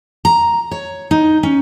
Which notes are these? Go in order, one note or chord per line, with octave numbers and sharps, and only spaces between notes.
A#5
C#5
D#4
C#4